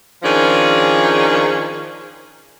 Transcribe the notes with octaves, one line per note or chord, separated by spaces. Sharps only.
D#3 F3 C#4 D4 G#4